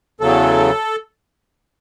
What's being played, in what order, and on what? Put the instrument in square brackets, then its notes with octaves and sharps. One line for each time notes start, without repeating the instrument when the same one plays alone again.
[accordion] E2 C#3 F#3 A4